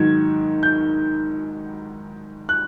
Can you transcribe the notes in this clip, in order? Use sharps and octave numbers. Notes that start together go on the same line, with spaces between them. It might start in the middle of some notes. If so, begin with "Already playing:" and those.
Already playing: G#2 D#3 F#3 G#6
G6
F#6